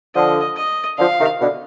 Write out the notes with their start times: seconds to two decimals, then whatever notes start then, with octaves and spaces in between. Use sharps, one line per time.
0.15 D3 F3 D#5
0.56 D#5
0.98 D3 F3 F5
1.18 C3 D#3
1.40 B2 D3